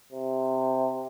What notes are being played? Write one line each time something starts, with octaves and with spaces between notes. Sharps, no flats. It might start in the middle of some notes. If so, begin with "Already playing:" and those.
C3